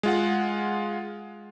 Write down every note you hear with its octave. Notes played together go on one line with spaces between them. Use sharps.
G#3 F4 F#5